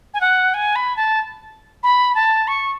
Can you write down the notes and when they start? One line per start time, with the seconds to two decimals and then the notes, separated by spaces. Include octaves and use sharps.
0.14 G#5
0.21 F#5
0.54 G#5
0.75 B5
0.96 A5
1.83 B5
2.15 A5
2.48 C#6